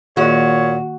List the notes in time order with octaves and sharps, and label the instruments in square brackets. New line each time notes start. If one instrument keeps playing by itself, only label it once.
[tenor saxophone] A#2 [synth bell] D#3 A#3 [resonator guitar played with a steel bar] F#4 [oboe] C#5